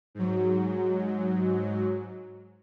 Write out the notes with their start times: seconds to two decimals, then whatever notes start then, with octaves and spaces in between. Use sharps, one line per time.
0.15 G#2 F#3